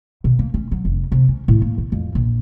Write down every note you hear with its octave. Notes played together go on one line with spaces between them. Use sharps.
B2
A#3
C#4
F#3
F1
C3
C#4
A2
A#3
F#2
F2
A#1